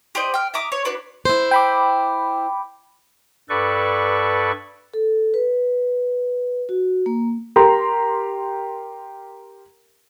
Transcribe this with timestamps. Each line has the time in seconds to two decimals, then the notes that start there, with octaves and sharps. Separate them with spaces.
0.15 G4 C5 D5 D#5
0.34 G5 F6
0.54 E5 A#5 D6 D#6
0.72 C#5
0.85 D4 F#4 B4 D5
1.25 E4 C5
1.51 G5 B5 D6
3.49 G2 A4 B4 D5 C#6
4.94 A4
5.34 B4
6.69 F#4
7.06 A#3
7.56 G4 A#4 G5 A#5 C6